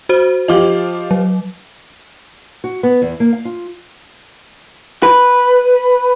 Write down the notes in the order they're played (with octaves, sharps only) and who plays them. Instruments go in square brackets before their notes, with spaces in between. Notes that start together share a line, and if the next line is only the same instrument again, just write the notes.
[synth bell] F#4 C5
[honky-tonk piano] F3 F4 G4 [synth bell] D#5 D6
[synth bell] F#3
[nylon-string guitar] F#4
B3
E2
A#3
F5
F4
[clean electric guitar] B4